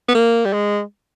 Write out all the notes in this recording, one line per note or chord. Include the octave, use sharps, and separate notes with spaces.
B3
A#3
G3
G#3